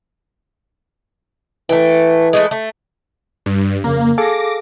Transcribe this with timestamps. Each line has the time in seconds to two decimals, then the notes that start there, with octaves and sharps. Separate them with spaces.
1.69 E3 A3 G5
2.33 G#3 A3 B4
2.51 A3
3.46 G2
3.84 F2 C#3 A#3
4.18 G#4 A4 F5 D6 A#6